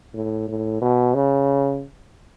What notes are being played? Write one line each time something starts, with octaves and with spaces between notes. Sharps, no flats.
A2
A2
B2
C#3